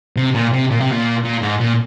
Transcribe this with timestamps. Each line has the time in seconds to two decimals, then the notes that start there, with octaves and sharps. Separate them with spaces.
0.16 C3
0.35 A#2
0.53 C3
0.71 A#2
0.80 C3
0.92 A#2
1.24 A#2
1.42 G#2
1.60 A#2